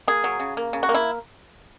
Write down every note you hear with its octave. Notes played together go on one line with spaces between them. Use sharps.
A#3 G#4
F#3
C#3
A#3
C#3
F#4
A#3
E4